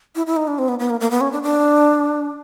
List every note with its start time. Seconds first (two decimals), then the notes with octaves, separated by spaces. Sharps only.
0.16 E4
0.27 E4
0.36 D#4
0.47 D4
0.58 C4
0.68 B3
0.79 B3
0.90 A#3
1.00 A#3
1.11 B3
1.21 C#4
1.32 D4
1.43 D4